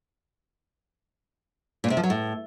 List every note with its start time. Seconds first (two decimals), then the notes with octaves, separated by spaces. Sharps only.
1.84 A#2
1.90 C3
1.97 F3
2.03 F#3
2.10 A2